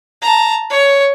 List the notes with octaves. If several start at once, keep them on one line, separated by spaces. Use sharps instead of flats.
A5 A#5
C#5